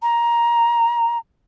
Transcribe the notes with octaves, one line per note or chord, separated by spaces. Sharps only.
A#5